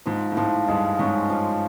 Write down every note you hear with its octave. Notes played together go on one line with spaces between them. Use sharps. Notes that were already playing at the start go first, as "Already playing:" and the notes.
G#2 F3
A2
G#2 F3
G2 G#3
G#2 C#4
F3